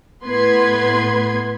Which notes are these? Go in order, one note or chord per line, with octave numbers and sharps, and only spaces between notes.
A2 B3 B4 C6 G#6